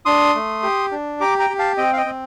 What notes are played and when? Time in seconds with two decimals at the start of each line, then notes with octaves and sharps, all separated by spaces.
0.06 D4 C6 D#6
0.35 A3
0.63 G4
0.91 D4
1.21 G4 A#5 D6
1.39 G5 A#5
1.50 G4
1.59 F5 A5
1.77 C4 D#5 G5
1.93 F5
1.97 D#5 G5
2.06 C4